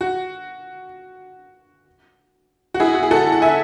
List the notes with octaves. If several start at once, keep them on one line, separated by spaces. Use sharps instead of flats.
F#4
F#4
E4 G#4
F#4
G#4
F#4 A4
F#5
E5 G#5